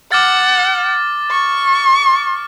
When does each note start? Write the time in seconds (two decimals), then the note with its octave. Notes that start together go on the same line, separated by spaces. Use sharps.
0.12 F#5 D6 F6 A6
1.31 C#6